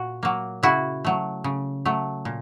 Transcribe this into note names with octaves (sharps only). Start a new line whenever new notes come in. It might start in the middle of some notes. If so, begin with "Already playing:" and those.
Already playing: A#2 F#4
F#3 A#3
C#3 E4 F#4
F#3 A3
C#3
F#3 A3
A#2